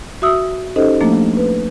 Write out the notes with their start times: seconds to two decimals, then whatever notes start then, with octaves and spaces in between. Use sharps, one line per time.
0.22 F#4 E5 D#6 E6
0.76 C#4 D#4 G4 A4 C5 D#5
1.01 F3 A3 A#3 D4
1.37 B4